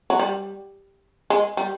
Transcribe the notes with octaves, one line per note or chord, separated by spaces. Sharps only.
F#3
G3
G#3
G3